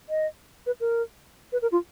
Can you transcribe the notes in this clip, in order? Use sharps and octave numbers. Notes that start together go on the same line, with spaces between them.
D#5
B4
A#4
B4
A#4
F4